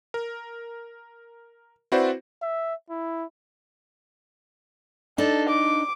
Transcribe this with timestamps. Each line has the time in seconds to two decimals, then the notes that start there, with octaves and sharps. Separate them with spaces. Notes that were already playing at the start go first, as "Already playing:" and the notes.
0.14 A#4
1.92 C4 E4 F#4 B4 C5 D5
2.42 E5
2.90 E4
5.18 D4 D#4 A4
5.49 D6